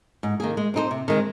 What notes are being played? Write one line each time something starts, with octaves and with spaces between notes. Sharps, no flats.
G#2
D#3 A#3 G#4
G#3
C4 D#4 G#4 C5
C3
D#3 G#3 C4